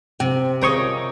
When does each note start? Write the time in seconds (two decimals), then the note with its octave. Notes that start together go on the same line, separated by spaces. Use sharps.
0.20 C3 C4 G4
0.62 G#1 C#3 F3 A#4 C5 C#5 D#5 C#6